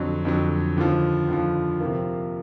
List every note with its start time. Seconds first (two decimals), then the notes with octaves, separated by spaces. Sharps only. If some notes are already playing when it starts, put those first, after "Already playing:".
Already playing: F2 D3 F#3
0.25 F2 D3 F#3
0.76 D#2 D3 F3
1.28 D#2 D3 F3
1.80 C3 F3 A#3